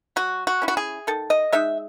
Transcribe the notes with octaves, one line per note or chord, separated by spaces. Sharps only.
F#3 F#4
F#4
C#4 E4
F#4
G#4
D#3 A4
D#5
G#3 D#4 E5